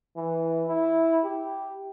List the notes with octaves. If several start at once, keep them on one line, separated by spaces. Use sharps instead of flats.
E3
E4
G4